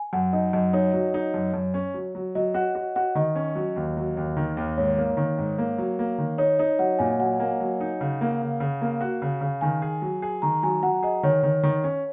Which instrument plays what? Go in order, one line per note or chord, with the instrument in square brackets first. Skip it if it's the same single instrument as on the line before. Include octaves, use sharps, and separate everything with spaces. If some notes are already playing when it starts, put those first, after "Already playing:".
Already playing: [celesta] G#5
[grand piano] F#2 [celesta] F#5
[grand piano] D#4 [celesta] D#5
[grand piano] F#2 [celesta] D#5
[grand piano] D#4 [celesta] C#5
[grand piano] F#3
D#4
F#2
F#2
C#4
F#3
F#3
[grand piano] F#3 [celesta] D#5
[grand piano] F#4 [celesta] F#5
[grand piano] F#4
[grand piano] F#4 [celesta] F#5
[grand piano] D#3 [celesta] D#5
[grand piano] C#4
F#3
D#2
F#3
D#2
D#3
D#2
[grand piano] G#2 [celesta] C#5
[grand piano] A#3
D#3
G#2
A#3
F#3
A#3
D#3
[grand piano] D#4 [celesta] C#5
[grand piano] D#4 [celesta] D#5
[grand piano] F#3 [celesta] F#5
[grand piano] A#2 [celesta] G#5
[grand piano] F#3 [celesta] F#5
[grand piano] A#3
F#3
D#4
C#3
A#3
C#3
C#3
A#3
F#4
C#3
C#3
[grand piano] D#3 [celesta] G#5
[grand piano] G#4
F#3
G#4
[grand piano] D#3 [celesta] A#5
[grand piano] F#3 [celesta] G#5
[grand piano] F#3 [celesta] F#5
[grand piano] G#4 [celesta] D#5
[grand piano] D#3 [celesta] C#5
[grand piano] D#3
D#3
C#4